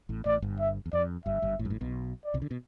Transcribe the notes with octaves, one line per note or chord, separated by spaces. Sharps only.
A1 A2
A1 A2 D5
G1 G2
E5
E2
F2 D5
G1 G2 E5
G1 G2
A1 A2
G2
A1 A2
B1 B2
D5
C2 C3
D3
B2